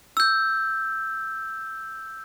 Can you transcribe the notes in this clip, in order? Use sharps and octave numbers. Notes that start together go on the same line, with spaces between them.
E6 G6